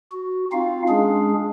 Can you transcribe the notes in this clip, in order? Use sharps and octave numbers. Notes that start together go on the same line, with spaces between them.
F#4
C4 D#4 F4 F5
G#3 C#4 D4 G#4